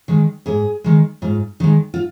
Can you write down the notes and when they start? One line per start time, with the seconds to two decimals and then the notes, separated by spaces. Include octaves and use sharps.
0.08 D#3 G#3
0.46 G#2 G#4
0.84 D#3 G#3
1.22 G#2 F4
1.60 D#3 G#3 D#4
1.94 F4